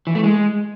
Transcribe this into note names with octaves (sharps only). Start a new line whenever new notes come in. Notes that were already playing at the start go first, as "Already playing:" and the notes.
E3
A3
G#3